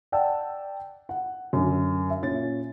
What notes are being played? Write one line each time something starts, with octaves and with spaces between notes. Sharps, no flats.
D5 F#5 G5 A5 E6
F#5
F#2 D3
E5
A#2 C#4 A6